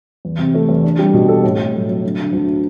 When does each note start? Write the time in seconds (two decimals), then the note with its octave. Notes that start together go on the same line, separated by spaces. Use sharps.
0.25 E2
0.38 C3
0.54 A3
0.69 E2
0.84 D4
0.99 G3
1.14 B2
1.29 A4
1.43 A2
1.59 A2
1.74 F#3
1.89 F#3
2.04 D3
2.18 D3
2.33 D2